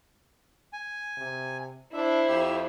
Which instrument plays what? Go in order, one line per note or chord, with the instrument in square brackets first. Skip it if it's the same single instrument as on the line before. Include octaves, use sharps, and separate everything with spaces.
[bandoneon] G#5
[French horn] C3
[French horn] D4 [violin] E4 C5 [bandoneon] E5
[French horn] F2 [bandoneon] G4 E6